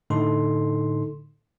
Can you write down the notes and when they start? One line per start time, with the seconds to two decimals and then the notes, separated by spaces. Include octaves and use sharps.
0.10 A2 D3 D#4 A4 C6